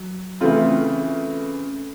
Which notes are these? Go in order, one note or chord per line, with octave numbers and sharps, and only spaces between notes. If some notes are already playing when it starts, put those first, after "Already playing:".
Already playing: F#3
C#3 E3 A3 C4 F4